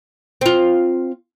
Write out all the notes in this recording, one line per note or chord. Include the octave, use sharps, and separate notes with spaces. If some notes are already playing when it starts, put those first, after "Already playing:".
C4 F4